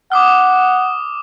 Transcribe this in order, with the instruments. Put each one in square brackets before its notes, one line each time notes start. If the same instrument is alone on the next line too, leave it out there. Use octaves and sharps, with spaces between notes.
[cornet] F#5 [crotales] D6 D#6 F6